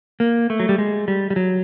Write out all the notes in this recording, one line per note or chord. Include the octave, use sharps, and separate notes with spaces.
A#3
A3
F#3
G3
G#3
G3
G3
F#3